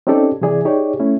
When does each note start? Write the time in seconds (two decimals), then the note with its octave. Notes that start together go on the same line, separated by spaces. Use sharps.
0.07 C4 C#4 D#4 G4 A4 D5
0.41 C3 E3 E4 G#4 D5 G#5
0.65 D#4 G4 G#4 C#5 D5
0.99 A3 C#4 E4